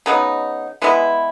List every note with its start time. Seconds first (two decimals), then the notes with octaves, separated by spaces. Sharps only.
0.06 C#3 F#3 B3 D#4
0.82 E3 G#3 B3 E4